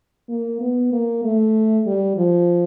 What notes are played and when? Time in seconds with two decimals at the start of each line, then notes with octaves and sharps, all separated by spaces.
0.29 A#3
0.61 B3
0.92 A#3
1.24 A3
1.87 G3
2.17 F3